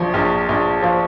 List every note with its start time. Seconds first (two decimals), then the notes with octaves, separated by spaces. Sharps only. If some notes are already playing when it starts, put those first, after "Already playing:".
Already playing: A#1 F3
0.14 A#1
0.49 A#1
0.82 F3